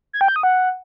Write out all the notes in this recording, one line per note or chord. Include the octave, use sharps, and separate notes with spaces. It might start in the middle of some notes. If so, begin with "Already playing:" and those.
G#6
G5
G6
D#6
F#5